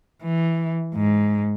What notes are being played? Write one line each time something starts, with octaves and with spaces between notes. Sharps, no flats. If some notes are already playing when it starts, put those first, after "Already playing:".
E3
G#2